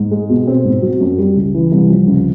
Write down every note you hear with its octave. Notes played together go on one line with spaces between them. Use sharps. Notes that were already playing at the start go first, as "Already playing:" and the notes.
Already playing: G#2
G#3
B2
C4
G#2
F#3
F#2
G3
C#2
E3
C2
F3
C#2